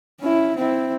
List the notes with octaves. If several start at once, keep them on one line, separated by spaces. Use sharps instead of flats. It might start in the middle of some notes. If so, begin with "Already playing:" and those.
C#4 E4
C4 E4